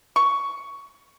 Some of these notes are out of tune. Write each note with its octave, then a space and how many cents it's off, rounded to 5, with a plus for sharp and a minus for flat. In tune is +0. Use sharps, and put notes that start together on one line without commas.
C#6 +10